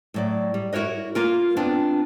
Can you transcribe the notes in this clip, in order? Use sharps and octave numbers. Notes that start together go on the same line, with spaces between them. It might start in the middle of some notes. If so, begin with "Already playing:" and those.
A2 F#3 D5
G3
E4 F#4 A#4 C#5 D#5
A#3 F4 A#4
B3 C4 D4 F4